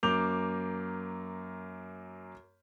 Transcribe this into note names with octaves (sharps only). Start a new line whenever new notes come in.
F#2 A#3 D6 G6 F7